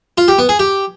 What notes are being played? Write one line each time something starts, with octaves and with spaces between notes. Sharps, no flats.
F4
G4
B3
G#4
G4